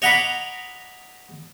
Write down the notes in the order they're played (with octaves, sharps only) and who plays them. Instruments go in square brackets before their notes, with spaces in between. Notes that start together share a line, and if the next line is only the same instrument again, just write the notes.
[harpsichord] C#5 D#5 F#5 A#5 B5 D6